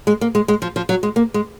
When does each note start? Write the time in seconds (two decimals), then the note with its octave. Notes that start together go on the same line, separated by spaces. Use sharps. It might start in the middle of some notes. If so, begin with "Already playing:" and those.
0.07 G#3
0.21 A#3
0.35 G#3
0.48 G#3
0.62 F3
0.76 F3
0.89 F#3
1.03 G#3
1.16 A#3
1.34 G#3